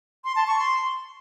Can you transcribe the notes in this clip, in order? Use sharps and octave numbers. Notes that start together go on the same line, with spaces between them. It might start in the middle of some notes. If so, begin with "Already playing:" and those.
C6
A5
C#6
C6